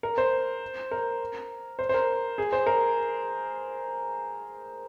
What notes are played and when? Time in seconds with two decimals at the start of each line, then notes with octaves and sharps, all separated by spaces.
0.03 A#4
0.18 C5
0.91 A#4
1.79 C5
1.89 C5
1.94 A#4
2.38 G#4
2.53 C5
2.67 A#4